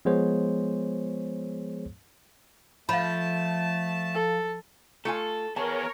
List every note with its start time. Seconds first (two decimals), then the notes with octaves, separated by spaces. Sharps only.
0.05 F3 G#3 B3 G#4 C5 C#5
2.89 F3 A3 F5 A5 B5
4.15 A4
5.05 A3 F4 A4 G#5
5.56 B3 G#4 A#4 C#5 A5